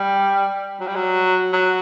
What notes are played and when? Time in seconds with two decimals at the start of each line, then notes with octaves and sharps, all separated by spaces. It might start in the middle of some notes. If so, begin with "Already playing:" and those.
Already playing: G3
0.80 F#3
0.87 G3
0.95 F#3
1.53 F#3